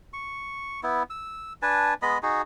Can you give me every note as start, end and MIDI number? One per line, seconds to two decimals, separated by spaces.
0.13 0.80 85
0.83 1.03 59
0.83 1.03 64
1.10 1.53 88
1.62 1.94 62
1.62 1.94 71
1.62 1.94 80
1.62 1.94 81
2.02 2.18 56
2.02 2.18 59
2.02 2.18 75
2.02 2.18 83
2.23 2.42 63
2.23 2.42 66
2.23 2.42 68